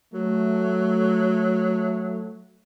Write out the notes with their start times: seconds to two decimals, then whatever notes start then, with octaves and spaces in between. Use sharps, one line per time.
0.14 F#3 A3